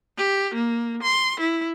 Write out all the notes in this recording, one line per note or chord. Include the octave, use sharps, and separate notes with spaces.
G4
A#3
C6
E4